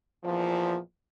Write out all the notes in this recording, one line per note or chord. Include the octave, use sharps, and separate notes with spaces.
E2 A#2 F3